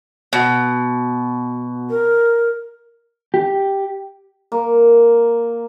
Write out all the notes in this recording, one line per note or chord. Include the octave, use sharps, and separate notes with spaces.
B2
A#4
G4
A#3